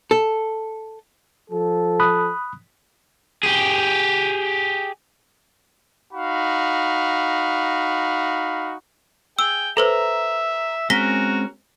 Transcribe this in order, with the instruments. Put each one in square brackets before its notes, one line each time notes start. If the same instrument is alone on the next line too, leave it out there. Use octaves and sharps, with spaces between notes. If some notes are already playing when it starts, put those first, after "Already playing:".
[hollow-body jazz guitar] A4
[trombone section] F3 A4
[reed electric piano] B5 D#6 F#6
[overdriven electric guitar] G4 G#4
[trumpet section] D#4 F#4 F5 B5
[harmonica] G#4 G5 [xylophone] E6
[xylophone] A4 B4 C5 [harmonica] E5 [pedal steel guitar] A#5
[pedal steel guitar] G#3 C4 C#4 [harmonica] F#4 A#4 [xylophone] A#6 B6 G7